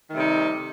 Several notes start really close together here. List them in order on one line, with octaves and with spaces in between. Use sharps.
D#3 A3 G3 C3 D#4